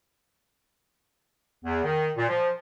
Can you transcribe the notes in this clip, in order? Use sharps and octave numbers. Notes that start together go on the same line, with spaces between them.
E2
D#3
A#2
F3